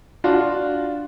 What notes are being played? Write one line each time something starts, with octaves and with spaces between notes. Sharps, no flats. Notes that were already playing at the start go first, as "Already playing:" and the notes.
D4 F4 F#4